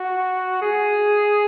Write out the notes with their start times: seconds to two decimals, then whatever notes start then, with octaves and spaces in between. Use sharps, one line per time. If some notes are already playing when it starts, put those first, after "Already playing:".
Already playing: F#4
0.62 G#4